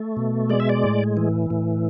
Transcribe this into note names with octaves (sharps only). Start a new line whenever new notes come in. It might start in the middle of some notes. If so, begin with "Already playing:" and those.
Already playing: A3
B2
G#3 D5
E5
D5
A2
E3
A2